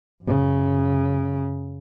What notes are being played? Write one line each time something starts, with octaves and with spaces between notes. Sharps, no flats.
F#2 C#3